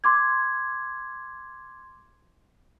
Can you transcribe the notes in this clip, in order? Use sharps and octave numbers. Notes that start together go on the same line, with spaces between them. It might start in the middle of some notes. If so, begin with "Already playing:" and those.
C6 D6 G#6